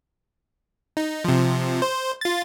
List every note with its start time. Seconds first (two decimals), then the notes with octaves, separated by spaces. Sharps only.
0.97 D#4
1.24 C3 F3
1.82 C5
2.21 F4 A6